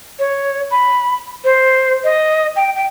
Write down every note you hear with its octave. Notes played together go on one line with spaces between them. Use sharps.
C#5
B5
C5
D#5
G5
G5